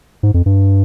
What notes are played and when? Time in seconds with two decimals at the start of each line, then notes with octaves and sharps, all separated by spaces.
0.23 G#2
0.34 F2
0.46 G2